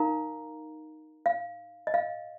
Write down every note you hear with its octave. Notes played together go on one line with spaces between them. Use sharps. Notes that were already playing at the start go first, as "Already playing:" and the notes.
Already playing: D#4 A#4 F5 A#5
F5
D#5
F5